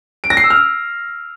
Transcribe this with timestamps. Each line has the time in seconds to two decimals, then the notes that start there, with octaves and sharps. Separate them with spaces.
0.24 D7
0.30 A#6
0.37 C7
0.44 E6
0.50 F6